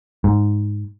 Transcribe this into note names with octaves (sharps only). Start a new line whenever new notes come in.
G#2